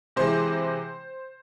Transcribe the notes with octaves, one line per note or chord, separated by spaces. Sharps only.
C3 E3 G#3 C5